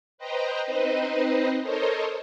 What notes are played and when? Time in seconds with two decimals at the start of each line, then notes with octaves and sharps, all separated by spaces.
0.18 B4 C5 D#5 G5 A#5
0.66 C4 D#4 B4 C5 D#5
1.62 A4 A#4 C5 C#5 D#5